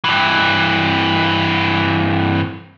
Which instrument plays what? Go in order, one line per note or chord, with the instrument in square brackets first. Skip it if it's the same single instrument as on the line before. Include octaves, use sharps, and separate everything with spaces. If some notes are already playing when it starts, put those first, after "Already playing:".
[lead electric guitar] G2 E3